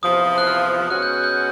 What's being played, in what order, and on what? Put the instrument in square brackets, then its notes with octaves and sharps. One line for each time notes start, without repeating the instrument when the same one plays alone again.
[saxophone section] E2 C3 F3 [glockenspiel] D#6
[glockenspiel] F#6
F6
[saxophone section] B2 G#3 C#4 F#4 [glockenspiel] F#6
[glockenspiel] G6
F#6
G6
F#6